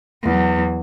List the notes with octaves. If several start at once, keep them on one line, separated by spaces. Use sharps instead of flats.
E2 F#3